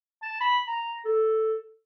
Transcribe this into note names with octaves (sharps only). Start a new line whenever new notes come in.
A5
B5
A#5
A4